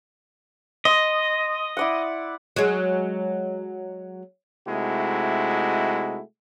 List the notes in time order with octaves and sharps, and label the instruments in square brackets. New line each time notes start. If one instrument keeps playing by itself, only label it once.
[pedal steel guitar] D#5 [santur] C6
[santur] E4 D5 F#5
[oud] F#3 G#3
[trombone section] C3 G#3 A3 D#4 E4 F#4